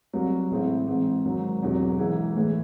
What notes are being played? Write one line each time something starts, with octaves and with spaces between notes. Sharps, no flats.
C2 C3 F#3
A1 A2 G#3 C4 E4
G#2 E3 C4
G#1 G#2 F#3
E1 E2 C3 F#3
G#2 E3 G#3
A2 E3 G#3